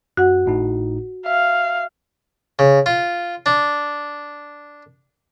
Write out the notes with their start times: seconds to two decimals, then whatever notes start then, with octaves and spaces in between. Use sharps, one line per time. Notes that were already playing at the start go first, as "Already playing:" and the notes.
0.17 F#2 F#4 F#5
0.46 G#1 A2 D#4
1.26 E5 F5
2.59 C#3
2.86 F4
3.46 D4